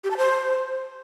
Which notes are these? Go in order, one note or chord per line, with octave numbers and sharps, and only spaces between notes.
G4
A5
C5